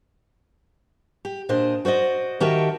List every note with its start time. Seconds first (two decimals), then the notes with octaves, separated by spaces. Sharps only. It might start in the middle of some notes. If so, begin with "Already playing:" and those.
1.25 G4
1.49 A#2 D4 C5 D#5
1.85 F#4 C5 D5 D#5
2.40 D#3 F#4 G4 A#4 E5 A5